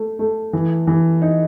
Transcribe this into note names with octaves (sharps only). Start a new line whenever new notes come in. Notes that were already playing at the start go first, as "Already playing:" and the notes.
Already playing: A3
A3
E3
E3
D#4